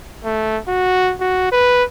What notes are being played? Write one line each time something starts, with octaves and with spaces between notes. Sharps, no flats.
A3
F#4
F#4
B4